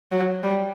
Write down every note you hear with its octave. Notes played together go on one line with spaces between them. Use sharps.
F#3
G3